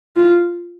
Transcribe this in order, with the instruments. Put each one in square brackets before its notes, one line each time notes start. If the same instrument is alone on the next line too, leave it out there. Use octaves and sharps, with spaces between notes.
[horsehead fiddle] F4